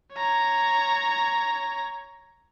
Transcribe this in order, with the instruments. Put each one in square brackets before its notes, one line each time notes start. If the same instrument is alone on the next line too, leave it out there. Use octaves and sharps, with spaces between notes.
[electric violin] C#5 A#5